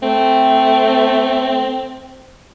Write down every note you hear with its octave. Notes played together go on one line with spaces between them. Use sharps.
A3 C4